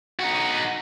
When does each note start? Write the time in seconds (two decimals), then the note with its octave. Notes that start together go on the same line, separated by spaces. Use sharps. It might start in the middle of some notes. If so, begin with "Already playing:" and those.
0.19 D#4 F#4